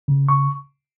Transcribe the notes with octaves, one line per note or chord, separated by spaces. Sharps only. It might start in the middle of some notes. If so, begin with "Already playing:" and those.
C#3
C#3 C#6